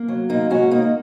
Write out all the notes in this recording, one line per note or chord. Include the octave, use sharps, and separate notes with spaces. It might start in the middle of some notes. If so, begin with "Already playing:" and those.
Already playing: A#3
F#3
A#2 A#3 D#4
G#3 C#4 F#4
G#3 A#3 D#4